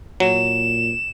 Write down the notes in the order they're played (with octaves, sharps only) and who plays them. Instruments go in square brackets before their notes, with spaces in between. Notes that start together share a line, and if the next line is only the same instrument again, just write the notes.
[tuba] A#2 [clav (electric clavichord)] F#3 [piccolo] E7